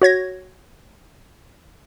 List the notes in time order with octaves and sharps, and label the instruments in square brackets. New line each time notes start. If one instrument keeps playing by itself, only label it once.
[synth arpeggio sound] F#4 C#5 G#6 A#6